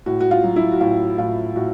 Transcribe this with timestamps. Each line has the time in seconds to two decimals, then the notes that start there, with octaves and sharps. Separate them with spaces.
0.06 A2 F#4
0.21 F#4
0.31 F4
0.43 F#3
0.56 E4
0.72 F#4
0.81 A2 F4
1.18 A2 F4
1.56 A2 F#4